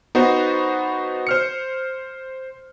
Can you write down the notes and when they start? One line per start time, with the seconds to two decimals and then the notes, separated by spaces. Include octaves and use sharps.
0.15 B3 D#4 F#4 C5
1.27 C5 F6 C#7